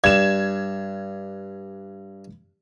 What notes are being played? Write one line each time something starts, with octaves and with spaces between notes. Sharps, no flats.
G2 G#6 E7